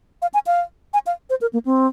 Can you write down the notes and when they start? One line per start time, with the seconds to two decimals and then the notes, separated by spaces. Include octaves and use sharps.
0.22 F5
0.34 G#5
0.47 F5
0.94 G#5
1.07 F5
1.30 C5
1.41 A#4
1.53 A#3
1.65 C4